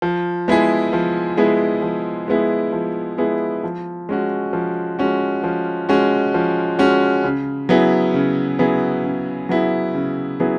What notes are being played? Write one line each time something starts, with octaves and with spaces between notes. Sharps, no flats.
F3
G#3 B3 E4 G#4
F3
G#3 B3 E4 G#4
F3
G#3 B3 E4 G#4
F3
G#3 B3 E4 G#4
F3
G#3 C#4 F#4
F3
G#3 C#4 F#4
F3
G#3 C#4 F#4
F3
G#3 C#4 F#4
C#3
F#3 B3 E4 G#4
C#3
F#3 B3 E4 G#4
C#3
F#3 B3 E4 G#4
C#3
F#3 B3 E4 G#4